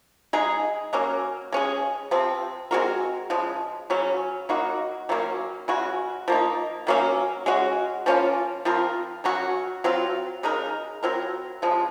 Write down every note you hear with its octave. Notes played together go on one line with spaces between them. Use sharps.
G#3 D#4 G#4
F#3 A#3 C#4
G#3 C#4 G#4
C3 F3 C4
G#3 C4 F#4 A#4
C#3 F3 G#3
C#3 F#3 C#4
F#3 A#3 D#4 F#4
D#3 F#3 A#3 C#4
C#3 G#3 C#4 F#4
F3 A#3 D#4
D#3 F#3 A#3 C#4
G#3 C#4 F#4
F3 A#3 C#4 F4
F3 C4 F4 A#4
D#3 F#3 C#4 F#4
F#3 C4 F4
C#3 G#3 D#4 A#4
F#3 C4 F4 A#4
C#3 F3 G#3